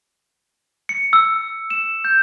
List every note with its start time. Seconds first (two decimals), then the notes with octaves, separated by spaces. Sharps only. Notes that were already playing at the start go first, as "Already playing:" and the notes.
0.89 C#7
1.13 E6
1.70 E7
2.05 G6